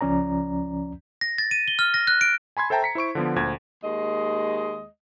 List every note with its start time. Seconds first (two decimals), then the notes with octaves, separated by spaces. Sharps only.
0.01 C#2 F3 C#4 D5 A#5
1.21 A#6
1.38 A6
1.51 D#7
1.68 G7
1.79 F6
1.94 A#6
2.07 F#6
2.21 D7
2.57 G#5 B5 C6 G#6
2.70 A4 C5 E5 G5 A5 A#5
2.83 A#5 B6 C#7
2.95 E4 C5 C#6 D7
3.15 D3 F3 B3
3.36 D2 A#2 C5 G#6
3.84 D#2 G#3 D#5